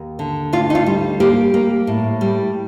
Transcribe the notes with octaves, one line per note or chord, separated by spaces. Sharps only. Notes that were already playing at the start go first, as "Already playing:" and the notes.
Already playing: D#2
D3
D2 F4
D#4
F4
G3
A#3 G4
A#3
A2
G3